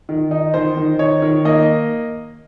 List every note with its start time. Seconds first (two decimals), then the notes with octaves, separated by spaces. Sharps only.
0.09 D#3
0.31 D#4
0.54 D#3 C5
0.77 D#3
0.99 D#4 C#5
1.22 D#3
1.45 A#3 D#5